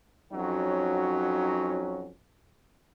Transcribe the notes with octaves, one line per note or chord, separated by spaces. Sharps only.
F2 F#3 C#4 D#4 F#4